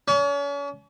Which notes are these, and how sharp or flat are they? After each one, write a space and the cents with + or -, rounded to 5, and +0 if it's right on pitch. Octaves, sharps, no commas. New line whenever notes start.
C#4 +40